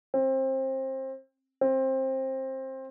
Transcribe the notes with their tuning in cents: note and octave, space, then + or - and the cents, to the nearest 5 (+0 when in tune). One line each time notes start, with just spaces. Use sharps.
C4 +25
C4 +20